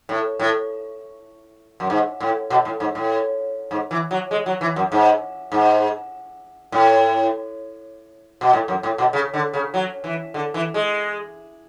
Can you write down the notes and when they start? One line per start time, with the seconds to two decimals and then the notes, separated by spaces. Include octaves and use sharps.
0.09 A2
0.39 A2
1.80 F#2
1.90 G#2
2.20 A2
2.50 B2
2.65 A2
2.80 G#2
2.95 A2
3.71 G#2
3.91 E3
4.11 F#3
4.31 G#3
4.46 F#3
4.61 E3
4.76 F#2
4.92 G#2
5.52 G#2
6.72 A2
8.41 B2
8.53 A2
8.68 F#2
8.83 A2
8.98 B2
9.13 C#3
9.34 D3
9.53 C#3
9.74 F#3
10.04 E3
10.34 D3
10.54 E3
10.74 G#3